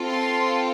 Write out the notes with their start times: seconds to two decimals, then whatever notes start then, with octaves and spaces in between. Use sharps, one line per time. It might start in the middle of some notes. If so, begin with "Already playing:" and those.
Already playing: C4 F4 A4
0.09 C6